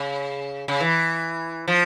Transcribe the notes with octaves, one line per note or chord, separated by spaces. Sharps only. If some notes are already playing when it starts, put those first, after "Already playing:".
Already playing: C#3
C#3
E3
F3